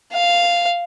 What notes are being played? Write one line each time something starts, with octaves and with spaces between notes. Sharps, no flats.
F5